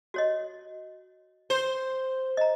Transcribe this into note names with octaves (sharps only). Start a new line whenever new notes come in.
F#4 C#5 D#5
C5
D#5 A#5